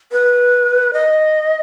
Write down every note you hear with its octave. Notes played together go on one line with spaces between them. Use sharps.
B4
D#5